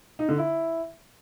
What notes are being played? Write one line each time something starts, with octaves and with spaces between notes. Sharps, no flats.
D#4
D3
E4